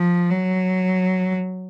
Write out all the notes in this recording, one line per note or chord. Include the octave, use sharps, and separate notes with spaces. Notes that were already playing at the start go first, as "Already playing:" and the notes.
Already playing: F3
F#3